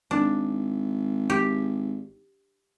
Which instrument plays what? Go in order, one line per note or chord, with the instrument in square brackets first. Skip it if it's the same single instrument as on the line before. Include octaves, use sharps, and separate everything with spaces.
[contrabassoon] G#1 [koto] D4
[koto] G4